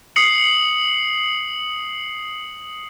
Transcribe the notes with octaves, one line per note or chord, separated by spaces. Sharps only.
D#6 C7 C#7 F#7